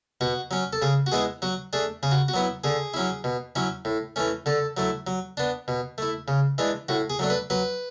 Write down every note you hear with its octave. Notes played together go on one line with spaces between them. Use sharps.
B2 F#4
F#3 C#4
A4
C#3 G#4
F#4
G#3 B3 E4 G#4
F#3 F#4
A3 D4 G#4
C#3 G#4
F#4
F#4
F#3 B3 E4
D3 G#4
F#3 C#4 E4
B2
F#3 C#4 E4
A2
E3 A3 C#4
D3 A4
F#3 A3 E4
F#3
B3 D4
B2
A3 E4
C#3
E3 G#3 D4
A2 F#4
G#4
F#3 A3 D4
B4
F#3 B4